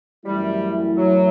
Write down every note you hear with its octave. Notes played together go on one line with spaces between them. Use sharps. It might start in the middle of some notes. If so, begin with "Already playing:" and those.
F#2 E3 G3 A3 E4
F#3